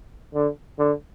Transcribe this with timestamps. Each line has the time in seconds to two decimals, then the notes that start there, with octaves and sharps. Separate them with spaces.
0.34 D3
0.79 D3